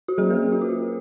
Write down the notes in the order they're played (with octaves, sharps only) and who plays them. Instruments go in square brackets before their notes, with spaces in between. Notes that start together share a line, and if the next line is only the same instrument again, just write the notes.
[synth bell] F#4
F#3 A#3 C#4 G#4
A#4
G#4
F#4
F4
F#4